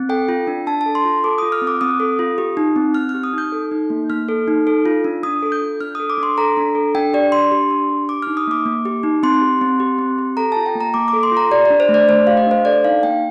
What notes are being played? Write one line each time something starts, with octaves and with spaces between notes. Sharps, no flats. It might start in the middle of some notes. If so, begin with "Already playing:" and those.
Already playing: C4
A4 G5
F4
D4
D4 A5
A5
A4
C6
F4
A4 D6
F4 D#6
F6
C4
D6
C4 D#6
A4
F4
G4
D#4
C4
C4 F6
F6
G4
D#6
D#4 G6
A4
D#4
A#3
A#3 F6
A4
D#4
A4
F4
D4
D4 D#6
A4
G6
F4
D4 F6
A4 D#6
D6
D4
C6
A4 A#5
D4
A4
D4 G5
G4 D5
D4 C6
G4
D4
G4
G4 D6
D#4 F6
D#6
A#3 D6
A#3
G4
D#4
C4 C6
G4
C4
G4
C4
G4
A4 A#5
F4 A5
G5
A#3
A#5
A#3 D6
D6
A4
C6
F4
A#5
G4 D5
D4 D5
C5
A3
D5
A3 C5
G4 F5
D#5
D4 C5
A4 D5
D#4 F5
A#3 G5